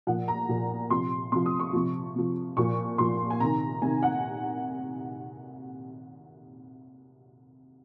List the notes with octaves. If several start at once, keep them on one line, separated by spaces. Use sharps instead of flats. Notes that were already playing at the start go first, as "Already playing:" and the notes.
A#2 F3 F#5
A#5
A#2 F3
C3 F3 C6
C3 F3 C6
D#6
C#6
C3 F3
C3 F3
A#2 F3 C#6
A#2 F3 C6
G#5
C3 D#3 A#5
C3 D#3 G#5
F#5